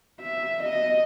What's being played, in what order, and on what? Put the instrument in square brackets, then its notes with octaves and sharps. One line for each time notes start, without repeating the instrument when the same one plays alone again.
[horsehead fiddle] E5
D#5